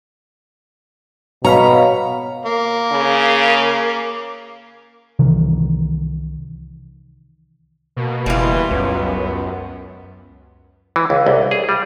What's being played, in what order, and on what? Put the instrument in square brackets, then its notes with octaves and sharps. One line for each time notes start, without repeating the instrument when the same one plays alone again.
[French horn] B2 [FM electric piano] C#5 F5 B5 [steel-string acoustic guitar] A#5
[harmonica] A#3
[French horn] C#3
[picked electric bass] C2 C3 D#3 E3
[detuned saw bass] B2 [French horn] A#3
[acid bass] F#1 [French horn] E3 [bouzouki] G3 F4
[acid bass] C#2 [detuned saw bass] F#2 [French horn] B3
[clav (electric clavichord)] E3
C#2
C2
G#4
G3